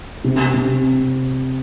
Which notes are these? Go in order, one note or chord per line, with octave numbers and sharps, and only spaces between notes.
C3
C3